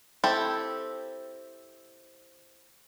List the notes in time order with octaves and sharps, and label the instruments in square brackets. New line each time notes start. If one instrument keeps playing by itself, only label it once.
[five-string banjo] C4 E4 G4 A4